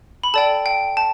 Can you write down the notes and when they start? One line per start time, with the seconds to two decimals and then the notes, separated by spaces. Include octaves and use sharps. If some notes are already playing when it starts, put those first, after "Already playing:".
0.23 B5
0.34 A4 D5 G5 A5
0.66 G5
0.97 A5